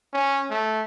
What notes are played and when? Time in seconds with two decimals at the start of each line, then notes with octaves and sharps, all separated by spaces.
0.13 C#4
0.50 A3